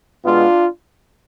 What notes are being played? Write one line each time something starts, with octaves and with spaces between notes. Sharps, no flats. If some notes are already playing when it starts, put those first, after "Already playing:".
B2 G#3 B3 D4 F4